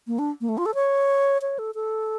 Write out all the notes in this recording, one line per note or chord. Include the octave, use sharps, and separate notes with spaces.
A#3
D4
A#3
A3
F4
A4
C#5
C#5
A4
A4